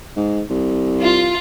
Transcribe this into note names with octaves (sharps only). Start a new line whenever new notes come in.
G#2
C2
F4